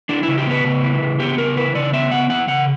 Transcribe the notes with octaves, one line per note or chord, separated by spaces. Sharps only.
E3 D4
E4
C#3
G4
B3 B4
C#3
E3
C#3
B3 G4
C#3 A#4
E3 B4
C#3 D5
B3 E5
C#3 F#5
E3 F#5
C#3 F#5